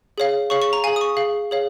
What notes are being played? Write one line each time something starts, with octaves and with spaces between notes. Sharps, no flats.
G#4 C#5 F5
G#4 C#5 F5 C#6
C#6
A#5
G#4 F5 G#5
D#6
C#6
G#4 F5
G#4 C#5 F5